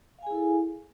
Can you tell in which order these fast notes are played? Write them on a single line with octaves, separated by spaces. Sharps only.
F5 G#5 G#4 E4 A4